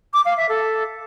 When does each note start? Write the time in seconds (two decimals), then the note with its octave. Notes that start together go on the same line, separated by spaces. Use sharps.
0.13 D6
0.25 F5
0.37 E5
0.49 A4